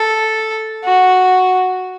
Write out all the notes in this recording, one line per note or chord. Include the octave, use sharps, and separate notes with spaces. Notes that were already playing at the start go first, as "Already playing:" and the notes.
Already playing: A4
F#4